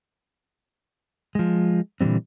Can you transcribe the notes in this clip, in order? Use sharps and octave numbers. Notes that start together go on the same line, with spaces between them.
F3 G#3
A#2 D3 E3 G3 C4